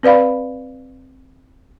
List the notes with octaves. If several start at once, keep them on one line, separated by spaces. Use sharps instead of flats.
C4 B4 D5 F5 B5